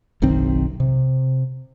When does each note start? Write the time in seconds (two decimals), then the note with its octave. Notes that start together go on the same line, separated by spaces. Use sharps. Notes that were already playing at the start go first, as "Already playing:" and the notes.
0.22 F#1 B1 D#3 C4
0.80 C3